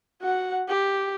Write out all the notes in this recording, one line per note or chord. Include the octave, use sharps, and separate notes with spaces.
F#4 F#5
G4